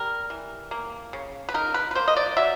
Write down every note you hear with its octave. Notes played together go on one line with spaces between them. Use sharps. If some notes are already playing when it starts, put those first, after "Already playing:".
Already playing: G3 A#4
E3
A#3
C#3
B4
D#4 A#4
B4
B4
A#3 C5
D#5
D5
F#3 E5